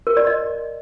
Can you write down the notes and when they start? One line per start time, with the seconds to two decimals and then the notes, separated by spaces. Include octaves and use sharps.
0.07 A#4
0.17 D5
0.27 D#5